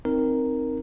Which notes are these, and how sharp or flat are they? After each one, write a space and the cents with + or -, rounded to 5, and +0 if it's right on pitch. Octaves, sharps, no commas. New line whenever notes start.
C4 +0 D#4 +0 A#4 +0